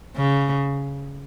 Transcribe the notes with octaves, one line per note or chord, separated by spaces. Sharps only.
C#3